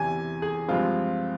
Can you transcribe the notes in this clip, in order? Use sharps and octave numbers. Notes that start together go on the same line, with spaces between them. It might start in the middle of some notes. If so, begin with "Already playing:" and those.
Already playing: E2 C3 E3 G#5
G#4
G2 F3 G#3 C4 F4